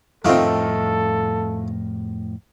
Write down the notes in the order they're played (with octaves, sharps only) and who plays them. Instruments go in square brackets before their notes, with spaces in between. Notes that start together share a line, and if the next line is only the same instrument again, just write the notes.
[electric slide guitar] F2 A2 D#5 [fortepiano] D#3 C4 [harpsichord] A3 F4 [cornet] A4